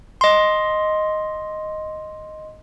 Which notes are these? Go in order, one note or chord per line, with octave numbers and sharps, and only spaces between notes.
D#5 C6